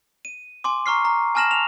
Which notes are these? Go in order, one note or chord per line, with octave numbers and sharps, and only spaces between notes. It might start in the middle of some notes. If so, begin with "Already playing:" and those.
D#7
G#5 C6 D6
A#5 C#6 F6 C7
A#5
G#5 A5 F6 A#6 E7 F#7
F7